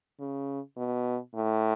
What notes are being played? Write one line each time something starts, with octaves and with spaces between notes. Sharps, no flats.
C#3
B2
A2